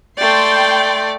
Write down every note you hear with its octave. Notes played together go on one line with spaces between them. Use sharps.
A3 D5 G5 C6